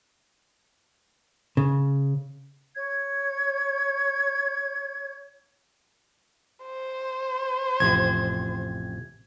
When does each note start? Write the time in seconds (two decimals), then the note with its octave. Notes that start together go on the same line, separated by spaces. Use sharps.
1.57 C#3
2.76 C#5 G#6
6.65 C5
7.80 A1 F2 C3 G#6